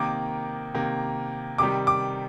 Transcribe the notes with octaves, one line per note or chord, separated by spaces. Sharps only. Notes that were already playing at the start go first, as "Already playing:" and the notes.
Already playing: C3 D#3 A#3 D6
C3 D#3 A#3
C3 D#3 G3 D6
D6